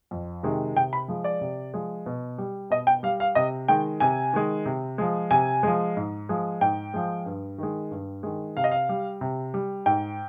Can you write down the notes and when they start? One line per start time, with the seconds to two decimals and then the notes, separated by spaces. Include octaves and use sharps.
0.11 F2
0.43 C3 D#3 G#3
0.76 C3 G5
0.93 B5
1.08 F3 G#3
1.24 D5
1.41 C3
1.74 F3 G#3
2.06 B2
2.38 G3
2.70 B2 D#5
2.87 G5
3.03 G3 F5
3.20 F5
3.35 C3 D#5
3.68 D#3 G#3 G5
4.00 C3 G#5
4.33 D#3 G#3
4.66 C3
4.98 F3 G#3
5.31 C3 G#5
5.63 F3 G#3
5.97 G#2
6.29 F3 G#3
6.61 G#2 G5
6.94 F3 G#3
7.26 G2
7.58 D#3 G#3
7.91 G2
8.23 D#3 G#3
8.57 C3 F5
8.64 D#5
8.71 F5
8.89 G3
9.21 C3
9.54 G3
9.86 G#2 G5